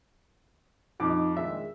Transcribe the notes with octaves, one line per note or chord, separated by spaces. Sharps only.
F2 D#4 D6
A#2 D#3 G#3 E5